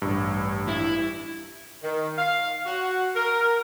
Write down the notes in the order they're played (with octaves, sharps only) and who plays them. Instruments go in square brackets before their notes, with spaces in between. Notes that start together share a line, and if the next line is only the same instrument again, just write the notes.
[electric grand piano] A1 G2
[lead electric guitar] E4
[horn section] D#3
F5
F#4
A#4